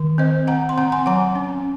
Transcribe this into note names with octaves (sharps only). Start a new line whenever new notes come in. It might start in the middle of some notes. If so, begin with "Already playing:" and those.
Already playing: D#3
C4 C5 D#5
C4 F#5 A#5
C6
C4 F#5 A#5
G#5 C6
F#3 F#5 A#5
C#4